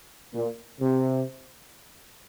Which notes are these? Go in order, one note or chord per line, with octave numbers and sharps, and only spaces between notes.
A#2
C3